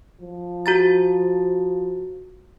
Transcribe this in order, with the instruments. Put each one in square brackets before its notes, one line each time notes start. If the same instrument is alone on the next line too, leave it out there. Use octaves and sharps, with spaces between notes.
[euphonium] F3
[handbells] F#4 A#5 A6